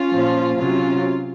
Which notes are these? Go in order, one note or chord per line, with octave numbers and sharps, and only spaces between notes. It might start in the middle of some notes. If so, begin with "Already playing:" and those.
Already playing: C#4 F4
A#2 F3
C3 F#3 C#4 F4